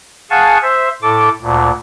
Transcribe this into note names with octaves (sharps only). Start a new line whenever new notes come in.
G#4 F5 F#5 G#5 A5 C#6
C5 E5
A2 A4 D6
D2 A#2